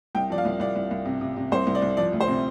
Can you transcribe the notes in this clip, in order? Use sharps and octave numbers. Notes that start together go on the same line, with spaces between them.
C2 G5
F3 D5
F5
C2
C2 D5
C2
C2
C3
C3
C3
C2 C5
C2
D5
C2
F3 D5
D2
C5
C3